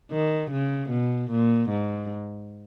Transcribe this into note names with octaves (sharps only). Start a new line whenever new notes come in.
D#3
C#3
B2
A#2
G#2